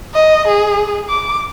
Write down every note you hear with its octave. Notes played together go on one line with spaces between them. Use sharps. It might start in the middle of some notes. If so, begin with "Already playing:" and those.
D#5
G#4
D6